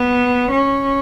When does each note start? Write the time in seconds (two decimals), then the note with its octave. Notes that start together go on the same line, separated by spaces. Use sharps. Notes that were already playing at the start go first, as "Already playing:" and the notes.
Already playing: B3
0.51 C#4